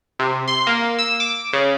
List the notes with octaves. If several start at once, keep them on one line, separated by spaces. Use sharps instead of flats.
C3
C6
A#3
E6
D6
C#3